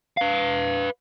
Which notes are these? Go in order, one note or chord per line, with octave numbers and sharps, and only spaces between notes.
B4 F5